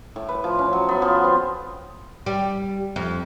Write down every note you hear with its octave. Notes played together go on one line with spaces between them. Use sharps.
A2
B4
F3
C#4
F#3
B3
F3
C4
G3
F2